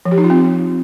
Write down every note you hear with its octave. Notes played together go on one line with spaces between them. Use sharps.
F3
G4
D#4
F4
C4